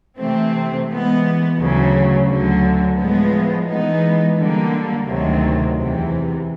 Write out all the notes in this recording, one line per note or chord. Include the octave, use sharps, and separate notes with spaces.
C3 E3 A3 C4
E3 G#3 B3
D2 C#3 F#3
D2 D3 F#3
A2 F3 G#3 B3
E3 G#3 B3 D#4
D3 G3 A#3
D2 C3 D#3 F#3
E2 C3 E3